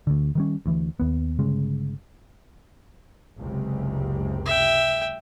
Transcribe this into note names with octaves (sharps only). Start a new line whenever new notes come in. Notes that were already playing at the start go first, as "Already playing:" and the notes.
D2 D3
D#3 G3 C#4
D2 E3
D#2 B3
G1 C#3 G#3
F#1 C#2 C3
E5 G5